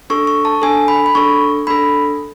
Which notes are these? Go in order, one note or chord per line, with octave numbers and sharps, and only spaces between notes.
D4 A4 C#6
C#6
A5
D4 A4 G#5
B5
B5
D4 A4 C#6
D4 A4 B5